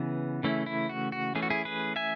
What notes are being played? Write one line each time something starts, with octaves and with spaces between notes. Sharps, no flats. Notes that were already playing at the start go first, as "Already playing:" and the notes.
Already playing: C#3 E3 B3 F#4
C#3 E3 A3 C#4 E4
E4
F#4
F#4
E3 A3 C#4 G#4
F#4
E4 G#4
G#4 B4
E5 G#5